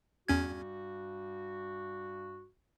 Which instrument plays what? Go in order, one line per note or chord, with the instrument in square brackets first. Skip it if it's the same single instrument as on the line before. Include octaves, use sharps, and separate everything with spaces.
[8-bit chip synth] E2 C#4 G#6 [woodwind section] G2 G3 F#4